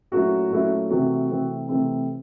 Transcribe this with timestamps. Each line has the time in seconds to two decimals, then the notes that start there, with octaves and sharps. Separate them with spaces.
0.12 A#2 F#3 A3 C#4 E4 F#4
0.51 A#2 F#3 A3 C#4 E4
0.90 C3 E3 A3 C4 F#4
1.30 C3 E3 A3 C4
1.68 C3 E3 A3 C4